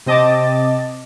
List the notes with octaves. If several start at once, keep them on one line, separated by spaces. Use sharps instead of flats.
C3 C4 D#5 A5 D6 A6